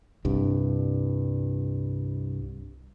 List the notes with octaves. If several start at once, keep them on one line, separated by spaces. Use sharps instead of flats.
C2 G2